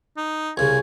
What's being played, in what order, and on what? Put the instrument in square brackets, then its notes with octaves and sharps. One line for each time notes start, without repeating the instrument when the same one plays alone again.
[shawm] D#4
[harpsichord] C2 C#3 [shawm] G#5